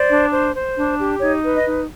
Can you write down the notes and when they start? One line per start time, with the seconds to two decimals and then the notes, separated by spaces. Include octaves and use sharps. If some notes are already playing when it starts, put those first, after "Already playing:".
Already playing: C5 D5
0.09 D4
0.31 C5
0.55 C5
0.77 D4
0.99 G4
1.21 D#4 C#5
1.43 B4
1.54 D#5
1.66 D#4